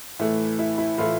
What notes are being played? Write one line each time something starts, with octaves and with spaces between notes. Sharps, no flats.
A2 E3 A3
E4
E4
A2 E3 A3 F4